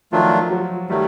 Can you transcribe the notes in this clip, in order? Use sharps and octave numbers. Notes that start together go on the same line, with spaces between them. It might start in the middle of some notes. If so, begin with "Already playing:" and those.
D#3 F3 F#3 A3 D4 F4
F#3
D#3 F#3 G3 A3